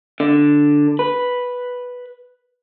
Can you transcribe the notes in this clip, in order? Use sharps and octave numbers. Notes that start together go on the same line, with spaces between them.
D3
B4